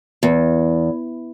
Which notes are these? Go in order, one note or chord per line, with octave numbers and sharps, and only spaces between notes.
E2